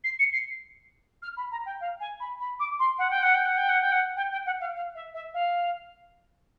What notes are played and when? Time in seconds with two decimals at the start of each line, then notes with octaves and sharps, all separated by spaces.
0.04 C7
0.19 C#7
0.33 C7
1.22 F6
1.37 B5
1.51 A#5
1.66 G5
1.81 F5
2.00 G#5
2.20 B5
2.40 B5
2.59 D6
2.79 C6
2.98 F#5
3.10 G5
3.22 F#5
3.34 G5
3.45 F#5
3.57 G5
3.69 F#5
3.81 G5
3.92 F#5
4.16 G5
4.32 G5
4.46 F#5
4.60 F5
4.75 F5
4.95 E5
5.14 E5
5.34 F5